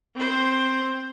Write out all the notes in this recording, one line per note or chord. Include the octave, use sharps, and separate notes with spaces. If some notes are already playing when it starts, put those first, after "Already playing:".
C4 C5